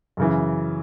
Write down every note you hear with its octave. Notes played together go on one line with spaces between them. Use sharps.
F#2 C#3 E3